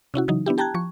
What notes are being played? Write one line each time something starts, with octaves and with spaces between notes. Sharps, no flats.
C3 C#4 E4 F#4
C#3 E3 F#3 D#4
B3 D4 E4 G4
G4 G5 A5 A#5 F#6 G#6
F3 C#6